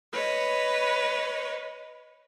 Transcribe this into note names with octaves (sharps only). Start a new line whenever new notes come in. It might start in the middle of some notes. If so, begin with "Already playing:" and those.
B4 C#5 D#5